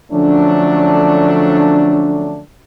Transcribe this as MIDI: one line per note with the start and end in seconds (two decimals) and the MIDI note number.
0.12 2.41 50
0.12 2.41 53
0.12 2.41 54
0.12 2.41 57
0.12 2.41 61
0.12 2.41 62